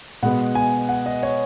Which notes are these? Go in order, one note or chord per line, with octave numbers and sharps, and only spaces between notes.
B2 G#3 B3 F#5
G#5
F#5
D#5
C#5